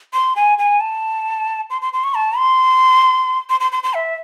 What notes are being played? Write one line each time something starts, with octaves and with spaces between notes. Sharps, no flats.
C6
G#5
G#5
A5
C6
C6
C6
C#6
A5
C6
C6
C6
C6
C6
E5